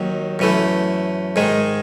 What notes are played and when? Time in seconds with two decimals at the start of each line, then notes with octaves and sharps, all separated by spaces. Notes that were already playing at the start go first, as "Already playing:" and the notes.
Already playing: D#2 D#3 F#3
0.39 F#2 E3 A3
1.36 G#2 D#3 G#3